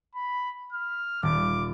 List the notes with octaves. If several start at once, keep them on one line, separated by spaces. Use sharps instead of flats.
B5
F6
D#1 D6